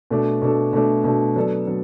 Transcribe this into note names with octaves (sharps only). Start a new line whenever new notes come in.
B2 A3 D4 A4
B2 A3 D4 A4
B2 A3 D4 A4
B2 A3 D4 A4
F#3 B3 D4 A4 D5
F#3 B3